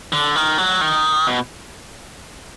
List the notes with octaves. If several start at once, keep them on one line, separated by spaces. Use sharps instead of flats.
D3
D#3
F#3
D#3
B2